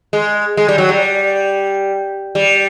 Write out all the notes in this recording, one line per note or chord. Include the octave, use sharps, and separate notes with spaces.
G#3
G#3
G3
F#3
G3
G3